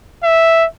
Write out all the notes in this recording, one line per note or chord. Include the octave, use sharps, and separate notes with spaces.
E5